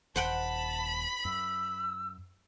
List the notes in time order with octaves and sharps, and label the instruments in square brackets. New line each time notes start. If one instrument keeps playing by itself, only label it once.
[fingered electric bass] D#1 [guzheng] C5 F#5 G5 [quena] A5 [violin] B5
[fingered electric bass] F#2 [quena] E6